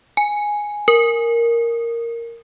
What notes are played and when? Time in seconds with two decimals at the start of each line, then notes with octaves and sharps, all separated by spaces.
0.17 G#5
0.88 A#4